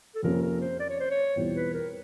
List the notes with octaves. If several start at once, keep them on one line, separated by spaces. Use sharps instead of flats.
A4
F2 C3 F3 A#3 C#4 A#4
A#4
C5
D5
C#5
C5
C#5
E2 B2 G3 C4 F4
B4
A#4